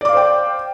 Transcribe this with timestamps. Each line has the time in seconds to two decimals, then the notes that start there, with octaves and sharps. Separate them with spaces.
0.01 D5
0.05 D6
0.09 F5
0.13 C5
0.17 G5